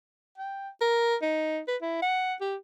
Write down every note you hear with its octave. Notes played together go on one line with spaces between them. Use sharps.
G5
A#4
D#4
B4
E4
F#5
G4